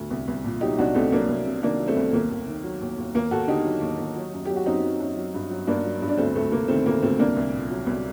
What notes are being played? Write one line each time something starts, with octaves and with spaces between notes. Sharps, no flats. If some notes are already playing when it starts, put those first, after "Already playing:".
Already playing: D2
C2
C2
A#2
F#3 D#4 G4
C2 D4 F#4
C2 A3 C4
F#3 A#3 D4
C2
C3
D#3 A#3 D4
F#3
A3 C4
C2
D#2 A#3
D#2
D#3
F#3
D#2
D#2
D#2 A#3
D#2 F#4 A4
D3 D#4 G4
F#3
D#2
D#2
F#3
F#2
F#3 G4
F#4
F#2 C4 D#4
F#3
F#2
F#3
G2
F#3
G2 A#3 D4
F#3
G2
D4
D2 A3 C4
D2 A3
C3 A#3
D#3 A3 C4
D2 A#3
D2 A3 C4
C2 A#3 D4
C2
A#2
F#3
C2